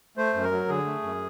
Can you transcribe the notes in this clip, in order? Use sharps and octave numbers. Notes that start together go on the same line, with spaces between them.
A3 C5
F#2
A#4
F#3
D3 G#4
A3
F#2